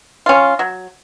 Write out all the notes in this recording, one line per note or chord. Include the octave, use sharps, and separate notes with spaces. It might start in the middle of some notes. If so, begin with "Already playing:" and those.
C#4 F4
F#3